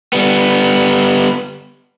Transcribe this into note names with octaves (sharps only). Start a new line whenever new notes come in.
G3 B3